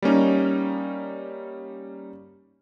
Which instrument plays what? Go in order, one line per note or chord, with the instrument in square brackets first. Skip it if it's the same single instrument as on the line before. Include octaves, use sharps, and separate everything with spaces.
[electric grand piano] G3 A#3 C#4 D#4